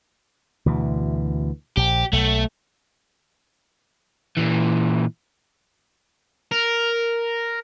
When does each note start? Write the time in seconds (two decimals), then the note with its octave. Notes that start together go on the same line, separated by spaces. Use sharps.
0.66 D2 B2 E3
1.77 A#1 G4
2.13 B1 A3
4.37 A#2 E3
6.52 A#4